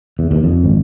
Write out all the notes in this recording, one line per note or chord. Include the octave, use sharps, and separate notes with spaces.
E2
D#2
F2
G#1